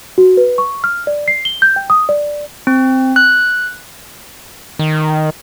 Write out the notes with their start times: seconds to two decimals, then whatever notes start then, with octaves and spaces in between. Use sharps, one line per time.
0.18 F#4
0.37 B4
0.58 C#6
0.84 F6
1.07 D5
1.28 C7
1.45 G7
1.62 G6
1.76 G5
1.90 D#6
2.09 D5
2.67 C4
3.16 F#6
4.79 D#3